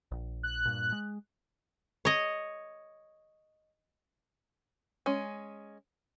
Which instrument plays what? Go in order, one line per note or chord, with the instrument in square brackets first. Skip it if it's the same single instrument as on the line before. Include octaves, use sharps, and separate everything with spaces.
[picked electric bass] A#1
[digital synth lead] F#6
[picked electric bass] G2 A#2
G#3
[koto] C#5 D#5
[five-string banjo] G#3 C#4